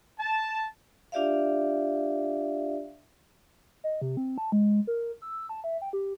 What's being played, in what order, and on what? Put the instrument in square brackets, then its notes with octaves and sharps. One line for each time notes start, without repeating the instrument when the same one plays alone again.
[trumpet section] A5
[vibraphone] D4 F4 G4 D5 E5 F5
[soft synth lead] D#5
C3
C4
A5
G#3
A#4
E6
A5
E5
G5
G4